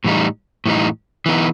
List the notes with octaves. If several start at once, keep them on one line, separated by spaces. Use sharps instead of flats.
A2 E3 G3 D#4
A2 E3 G3 D#4
E3 B3 D#4